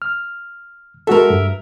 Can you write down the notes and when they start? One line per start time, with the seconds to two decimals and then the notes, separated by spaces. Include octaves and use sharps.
0.02 F6
1.07 G#3 F#4 A4 A#4 E5
1.30 G2